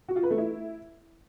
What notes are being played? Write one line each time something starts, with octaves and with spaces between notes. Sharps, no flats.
F#4
F4
B4
A3
E4